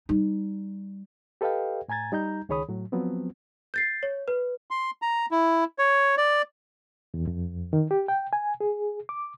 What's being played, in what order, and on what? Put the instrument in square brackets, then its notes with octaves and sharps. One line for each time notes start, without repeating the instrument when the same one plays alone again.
[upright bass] G3 D#4
[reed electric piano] G4 A4 B4 D#5 F5 G5
A2 G#5 A#5 G#6 A6
G3 D#4 A#5 G6
C#2 D#3 G#4 C#5 B5 D#6
A2 F#3
F3 F#3 B3 C4
[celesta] G6 A6 C7
C#5
B4
[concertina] C6
A#5
E4
C#5
D5
[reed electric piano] E2
F2
D#3
G4
G5
G#5
G#4
D6